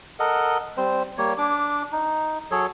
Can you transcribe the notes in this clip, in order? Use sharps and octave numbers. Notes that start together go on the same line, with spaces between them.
A4 A#4 D#5 F#5
G3 C4 C5
G3 A#3 C#5
D4 D6
D#4
F#3 G#4 A4 C#5